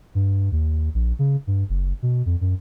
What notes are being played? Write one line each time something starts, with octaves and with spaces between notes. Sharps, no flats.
G2
D#2
A#1
C#3
G2
F#1
B2
F2
F#2